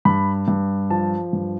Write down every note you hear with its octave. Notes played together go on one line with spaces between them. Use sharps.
G2 B5
G2
F3 A5
G2